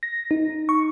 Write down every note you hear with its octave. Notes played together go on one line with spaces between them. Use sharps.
A#6
D#4
C#6